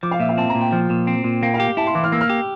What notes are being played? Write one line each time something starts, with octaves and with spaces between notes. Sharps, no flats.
F3 D6
F5
A#2 E5
F5
C4 A5
A#5
A#2
G5
F3
A#2
C4
A#2
A#3 G5
F5
G4
G5
E4 A5
C6
E3 D6
F6
A#3 E6
F6
G4